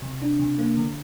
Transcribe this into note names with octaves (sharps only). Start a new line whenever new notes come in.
C3
D4
C3
A#3
D3